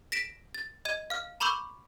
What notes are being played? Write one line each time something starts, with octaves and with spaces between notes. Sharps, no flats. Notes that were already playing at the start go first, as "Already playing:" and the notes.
A#6 B6 D7 E7
A6
D#5 G#6 D#7
F5 F6
A#5 B5 C#6 D6 E6 G6